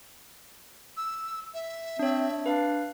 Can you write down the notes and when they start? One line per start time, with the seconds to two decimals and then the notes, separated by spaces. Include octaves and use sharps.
0.97 E6
1.54 E5
1.99 C4 D4 C#5
2.46 D4 B4 F5